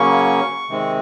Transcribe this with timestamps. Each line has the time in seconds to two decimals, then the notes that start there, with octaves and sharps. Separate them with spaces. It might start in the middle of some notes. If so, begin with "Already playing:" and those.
Already playing: C#3 F#3 A#3 C#4 C#6
0.69 C3 D#3 G#3 C4